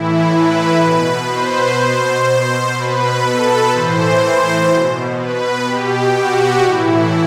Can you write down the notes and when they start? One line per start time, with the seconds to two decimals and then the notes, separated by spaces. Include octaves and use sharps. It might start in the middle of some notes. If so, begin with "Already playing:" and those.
Already playing: A2 E3 E4
0.31 B4
0.79 B2
1.28 C5
1.77 B2 C5
2.73 B2 B4
3.22 A4
3.71 A2 E3 C5
4.68 B2
5.16 B4
5.65 B2 G4
6.13 F#4
6.62 A2 E3 E4